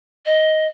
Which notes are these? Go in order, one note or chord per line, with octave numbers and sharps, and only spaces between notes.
D#5